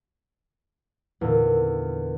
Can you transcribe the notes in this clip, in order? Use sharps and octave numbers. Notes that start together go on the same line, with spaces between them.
E2 A#2 D3